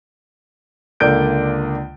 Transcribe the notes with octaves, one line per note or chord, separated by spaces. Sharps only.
C#2 D3 A#3 D5 G6 D7